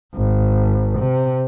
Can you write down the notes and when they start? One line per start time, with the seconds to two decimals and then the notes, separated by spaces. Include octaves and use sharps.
0.15 G#1
0.99 C3